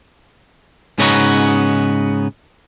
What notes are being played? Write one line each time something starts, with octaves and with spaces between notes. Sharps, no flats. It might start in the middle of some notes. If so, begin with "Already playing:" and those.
G#2 C#3 B3 C#4 D#4 F#4